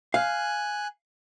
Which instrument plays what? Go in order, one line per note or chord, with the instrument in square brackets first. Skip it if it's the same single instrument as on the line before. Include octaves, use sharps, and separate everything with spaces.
[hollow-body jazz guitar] F5 [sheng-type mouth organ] G#5 F#6